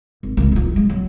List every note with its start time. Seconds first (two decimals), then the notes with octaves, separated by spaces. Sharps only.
0.23 G#1
0.37 C2 G#3
0.52 D#1 F3
0.76 G#3
0.90 F#3